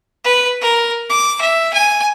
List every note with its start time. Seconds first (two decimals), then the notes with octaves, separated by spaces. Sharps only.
0.24 B4
0.61 A#4
1.10 D6
1.41 E5
1.73 G#5